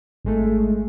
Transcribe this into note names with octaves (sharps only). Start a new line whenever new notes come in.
G#1 G#3 A3